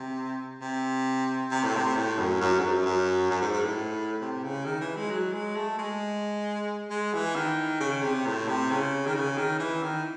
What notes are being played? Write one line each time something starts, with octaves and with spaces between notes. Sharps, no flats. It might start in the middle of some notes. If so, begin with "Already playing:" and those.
Already playing: C3
C3
C3
A2
C3
A2
F#2
F#2
G#2
F#2
F#2
F#2
G#2
G#2
A2
C3
C#3
D#3
E3
G#3
F#3
G#3
A3
G#3
G#3
E3
D#3
C#3
C3
A2
C3
C#3
D#3
C#3
D#3
E3
D#3